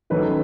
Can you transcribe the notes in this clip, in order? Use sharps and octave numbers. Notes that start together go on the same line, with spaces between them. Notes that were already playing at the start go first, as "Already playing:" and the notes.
D#3 F#3 A3 C#4 B4